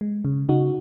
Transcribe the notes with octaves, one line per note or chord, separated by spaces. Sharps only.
G#3
C#3
C#3 D#4 F#4